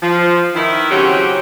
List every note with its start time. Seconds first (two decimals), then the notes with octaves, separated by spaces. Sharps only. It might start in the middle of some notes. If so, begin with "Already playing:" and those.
0.03 F3
0.55 D#3 E4
0.91 C#3 F#3 C4 C#4 F#4 G4